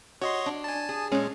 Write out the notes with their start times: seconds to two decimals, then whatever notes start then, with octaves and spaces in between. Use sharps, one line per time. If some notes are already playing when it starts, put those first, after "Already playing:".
0.21 F#4 C#5 D#5 C6
0.46 D4
0.64 G#5 A5
0.89 G#4
1.12 A#2 G#3 C#4